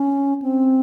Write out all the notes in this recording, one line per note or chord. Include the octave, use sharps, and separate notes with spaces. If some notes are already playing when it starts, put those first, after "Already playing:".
Already playing: C#4
C4